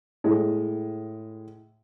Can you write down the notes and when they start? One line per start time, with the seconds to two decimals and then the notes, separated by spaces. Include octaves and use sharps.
0.24 A2 G#3